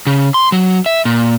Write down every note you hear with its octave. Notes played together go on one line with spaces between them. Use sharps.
C#3
C6
F#3
E5
A#2